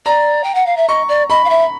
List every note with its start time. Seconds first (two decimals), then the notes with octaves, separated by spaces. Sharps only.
0.06 D5 A#5
0.44 G5
0.55 F#5
0.66 F5
0.77 E5
0.88 D#5 C#6
1.09 D5
1.30 D#5 B5
1.45 F5
1.50 E5